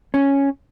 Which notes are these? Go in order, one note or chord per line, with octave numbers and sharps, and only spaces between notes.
C#4